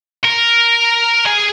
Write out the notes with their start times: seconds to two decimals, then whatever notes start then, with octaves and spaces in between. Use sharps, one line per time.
0.24 A#4
1.26 G#4 G#5